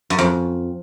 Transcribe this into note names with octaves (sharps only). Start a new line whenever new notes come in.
F#2
F2